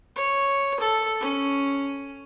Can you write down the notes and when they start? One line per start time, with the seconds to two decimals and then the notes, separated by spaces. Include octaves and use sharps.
0.16 C#5
0.80 A4
1.21 C#4